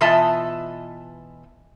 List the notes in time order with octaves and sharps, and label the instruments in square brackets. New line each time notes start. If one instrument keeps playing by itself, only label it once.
[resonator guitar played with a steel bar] B2 E3 F4 D#5 E5 A5